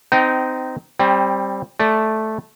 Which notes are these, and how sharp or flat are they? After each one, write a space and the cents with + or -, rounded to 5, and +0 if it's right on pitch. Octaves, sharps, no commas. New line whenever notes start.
C4 -25 D#4 +0 G5 -30
G3 +0 C4 +20
A3 -10 D5 +0